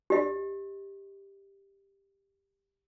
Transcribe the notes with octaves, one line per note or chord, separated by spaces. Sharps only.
G4 D#5